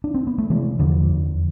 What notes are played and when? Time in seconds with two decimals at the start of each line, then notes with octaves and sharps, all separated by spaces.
0.04 D4
0.14 C4
0.27 B3
0.38 A3
0.50 C3 E3 G#3
0.79 E2 D3 F3
1.09 F2